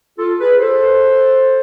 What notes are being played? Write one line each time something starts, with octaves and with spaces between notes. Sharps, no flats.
F4 A4
G#4 B4
A4 C5